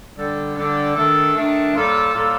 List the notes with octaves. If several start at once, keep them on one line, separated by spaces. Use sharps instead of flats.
D3 G3 D4 A4
D3 G3 D4 A4
D#3 A3 D4 A4
D#3 A3 D4 A4
A2 G3 A#3 F4 A4
A2 G3 A#3 F4 A4